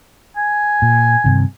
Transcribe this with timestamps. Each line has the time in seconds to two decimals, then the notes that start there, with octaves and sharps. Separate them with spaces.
0.36 G#5
0.82 A#2
1.24 G2 C3 D#3